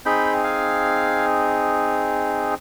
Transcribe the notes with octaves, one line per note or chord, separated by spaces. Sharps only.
C4 D#4 G#4 G5 B5
F5 G#5